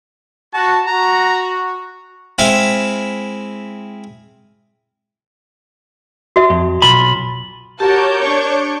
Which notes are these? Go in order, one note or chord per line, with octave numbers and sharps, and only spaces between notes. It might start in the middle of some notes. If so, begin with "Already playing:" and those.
F#4 A5
F#4 A#5
G#3 C4 E4 E5 F5
F#4 E5
F2
B1 F4 A#5 B5
F#4 G4 A#4 C#5 A5 D6 G6
D4 C#6